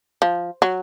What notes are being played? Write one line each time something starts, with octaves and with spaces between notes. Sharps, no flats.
F3
F#3